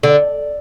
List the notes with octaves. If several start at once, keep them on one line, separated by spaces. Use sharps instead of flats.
D3